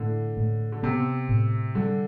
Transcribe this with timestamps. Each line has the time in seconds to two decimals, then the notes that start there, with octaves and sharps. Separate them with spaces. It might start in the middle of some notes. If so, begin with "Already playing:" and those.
Already playing: A2 D3
0.37 A2
0.72 D3
0.83 C3 B3
1.29 A2
1.75 D3 G3